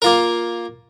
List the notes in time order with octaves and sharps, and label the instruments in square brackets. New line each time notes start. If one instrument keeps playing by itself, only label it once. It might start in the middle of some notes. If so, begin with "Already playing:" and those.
[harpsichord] A#3 F4 A#4